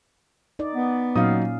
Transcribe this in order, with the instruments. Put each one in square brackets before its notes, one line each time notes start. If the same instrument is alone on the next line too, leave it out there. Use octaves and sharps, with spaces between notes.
[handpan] D#4 D5 D#5
[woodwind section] B3
[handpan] A#2 C#4 F5 [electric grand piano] F#3 D#4 D#6